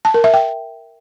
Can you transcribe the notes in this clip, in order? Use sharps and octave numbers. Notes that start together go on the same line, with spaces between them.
A5
A#4
E5
G5